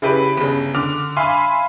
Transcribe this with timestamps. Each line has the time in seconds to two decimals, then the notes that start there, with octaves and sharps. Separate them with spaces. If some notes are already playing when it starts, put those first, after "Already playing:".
0.02 C#3 E4 G4 B4
0.37 G1 C#3
0.75 D3 D6 F6 F7
1.16 E5 F5 G#5 B5 C6 F6